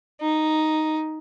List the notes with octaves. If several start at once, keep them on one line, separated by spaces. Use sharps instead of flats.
D#4